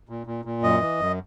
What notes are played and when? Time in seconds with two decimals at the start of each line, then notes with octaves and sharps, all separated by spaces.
0.09 A#2
0.27 A#2
0.45 A#2
0.62 F#2 D#5
0.81 E3
1.00 F#2